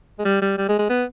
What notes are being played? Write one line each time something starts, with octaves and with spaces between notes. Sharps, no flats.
G#3
G3
G3
G3
G#3
G#3
B3